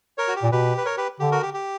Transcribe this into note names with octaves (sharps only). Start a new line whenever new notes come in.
A#4 C#5
F#4
G4
A#2
B2 G4 B4
B4
A#4 C#5
G4 B4
D3 G4
F#4 A#4
G4
G4